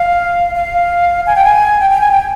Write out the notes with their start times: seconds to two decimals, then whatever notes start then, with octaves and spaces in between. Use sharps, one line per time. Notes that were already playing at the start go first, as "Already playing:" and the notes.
Already playing: F5
0.55 F5
1.27 G#5
1.35 G5
1.44 G#5
1.80 G5
1.90 G5
2.01 G#5
2.11 G5